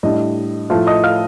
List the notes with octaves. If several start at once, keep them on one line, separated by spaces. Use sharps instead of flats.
A2 G3 D4 D#5
A2 F3 A3 F4 F5
D#5 D#6
F5 F6